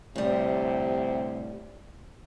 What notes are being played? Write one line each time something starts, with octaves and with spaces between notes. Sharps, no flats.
D2 A2 C3 G3